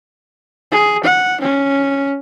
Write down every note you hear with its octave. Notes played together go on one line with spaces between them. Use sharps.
G#4
F#5
C#4